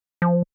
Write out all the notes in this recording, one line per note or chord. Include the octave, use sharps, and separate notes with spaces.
F3